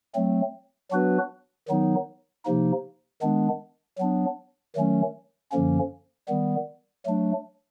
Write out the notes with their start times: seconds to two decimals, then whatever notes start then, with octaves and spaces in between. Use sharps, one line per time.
0.15 F#3 A3 C4
0.91 F#3 B3 D4 F#4 B4
1.68 D#3 F#3 B3 D#4
2.45 C3 F3 A#3 D#4
3.22 D#3 G#3 B3 D4
3.98 F#3 B3 D4
4.75 D#3 F#3 A3 C#4
5.51 F#2 D3 F3 A#3 C#4
6.28 D#3 G3 B3
7.05 F#3 A3 D4